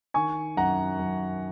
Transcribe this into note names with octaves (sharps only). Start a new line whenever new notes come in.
D#3 G#5 C#6
F#2 F#5 A#5
F#2